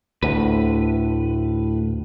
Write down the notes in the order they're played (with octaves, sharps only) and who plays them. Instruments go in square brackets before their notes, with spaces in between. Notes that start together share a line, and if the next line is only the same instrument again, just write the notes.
[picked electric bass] D2 [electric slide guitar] A2 B4